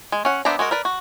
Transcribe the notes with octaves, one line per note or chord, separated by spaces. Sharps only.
G#3
C#4 F#5
B3 D4 C5 E5 A#5
G#3 F#4 A#4
A#4 B4 D5
F#4